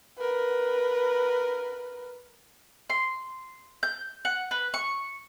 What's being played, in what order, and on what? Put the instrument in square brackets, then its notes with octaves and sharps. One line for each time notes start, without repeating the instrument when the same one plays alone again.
[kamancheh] A#4 B4
[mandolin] C6
G6
F#5
B4
C#6